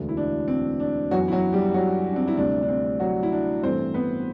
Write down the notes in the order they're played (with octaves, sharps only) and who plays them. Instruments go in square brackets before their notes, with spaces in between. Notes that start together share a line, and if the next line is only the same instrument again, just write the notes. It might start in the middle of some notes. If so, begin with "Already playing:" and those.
Already playing: [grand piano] E1 D2 D3
E4
D4
C4
D4
F#2 E3 F#3 B3 F#4
E4
F#3 F#4
G3 G4
F#3 F#4
D4
C4
E4
D2 C3 G3 C4 D4
D4
C4
F#3 F#4
E4
D4
A1 G2 E3 A3 C4 C5
B3 B4